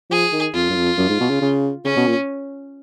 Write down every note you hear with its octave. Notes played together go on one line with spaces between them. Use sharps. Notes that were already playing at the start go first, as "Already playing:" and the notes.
F3 G#4
D#3
F2 F4
F#2
F2
F#2
G#2
B2
C#3
C#3
C#3 C#4
B2
A#2